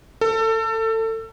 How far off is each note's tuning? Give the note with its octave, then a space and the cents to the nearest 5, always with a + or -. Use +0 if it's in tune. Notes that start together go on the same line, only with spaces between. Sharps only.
A4 +25